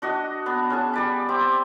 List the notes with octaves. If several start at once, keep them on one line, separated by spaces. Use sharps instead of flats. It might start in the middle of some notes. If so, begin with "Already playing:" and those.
D4 F#4 D#5
B3 D4
C#4 G#4 A5
G3 D5 B5
C4 G4 D6